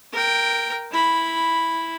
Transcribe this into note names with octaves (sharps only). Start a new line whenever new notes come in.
A#4 G5
E4 B5